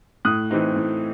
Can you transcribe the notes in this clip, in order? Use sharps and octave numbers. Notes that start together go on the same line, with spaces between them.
A2 D#6 F#6
E3 C4 D#4
A2